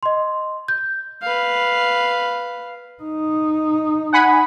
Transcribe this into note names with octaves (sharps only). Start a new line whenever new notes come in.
D#5 C6
G6
B4 F5
D#4
F#5 G#5 B5